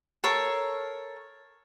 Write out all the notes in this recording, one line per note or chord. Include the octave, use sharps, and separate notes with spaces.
A4 A#4 C#5 C6